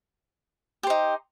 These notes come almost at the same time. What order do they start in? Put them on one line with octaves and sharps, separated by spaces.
G4 C5 D#4